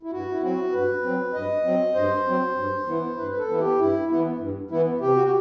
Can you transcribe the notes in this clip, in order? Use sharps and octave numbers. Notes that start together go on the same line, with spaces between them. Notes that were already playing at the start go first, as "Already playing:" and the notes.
E4
G2 F#4
E4
F#3 C4 F#4
G2 B4
F#3 C4
G2 D#5
F#3 C4
G2 C5
F#3 C4
G2
E3 B3 E4
G2 B4
B4
A4
E3 B3 E4
G4
G2 E4
E3 B3 E4
G2
E3 B3 E4
C3 G4
F#4
G4